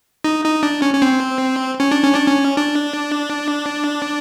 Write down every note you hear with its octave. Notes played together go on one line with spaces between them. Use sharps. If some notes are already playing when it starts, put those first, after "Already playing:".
D#4
D#4
D4
C#4
C#4
C4
C#4
D4
C#4
D4
C#4
D4